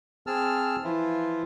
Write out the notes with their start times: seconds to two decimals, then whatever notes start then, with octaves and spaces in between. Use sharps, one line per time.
0.27 C4 G#4 A5 E6 F6
0.84 E3 F3 E4 F4